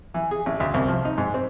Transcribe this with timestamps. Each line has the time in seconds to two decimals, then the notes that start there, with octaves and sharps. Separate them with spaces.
0.14 E3
0.31 G#4
0.46 A1
0.60 D2
0.74 C2
0.88 F3
1.05 D#4
1.18 G#2
1.34 C4